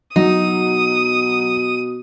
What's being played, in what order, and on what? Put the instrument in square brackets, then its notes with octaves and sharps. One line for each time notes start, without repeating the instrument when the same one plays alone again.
[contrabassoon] B2 [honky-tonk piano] F#3 [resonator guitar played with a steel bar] D#4 [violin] D#6